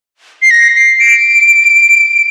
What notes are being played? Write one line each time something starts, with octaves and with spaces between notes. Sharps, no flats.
C7
A#6
C7
D7